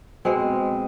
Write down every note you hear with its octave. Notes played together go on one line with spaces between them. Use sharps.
B2 G#3 C4